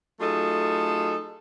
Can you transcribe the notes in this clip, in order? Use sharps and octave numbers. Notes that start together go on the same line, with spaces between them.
F#3 A3 D#4 F4 G#4 A4